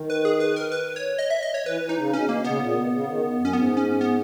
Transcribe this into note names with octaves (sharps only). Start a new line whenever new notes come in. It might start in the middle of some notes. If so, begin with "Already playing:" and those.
Already playing: D#3
B4
G#4
B4
A#4
B4
C#5
D#5
E5
D#5
C#5
E3 B4
E3
D#4
C#3
B2 C#4
B2 A#3
C#3 B3
A#2
C#3
B2
C#3
D#3
F#2
C#4
G#2 B3
C#4
B3